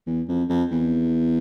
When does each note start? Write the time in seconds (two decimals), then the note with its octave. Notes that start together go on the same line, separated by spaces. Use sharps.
0.07 E2
0.29 F2
0.49 F2
0.71 E2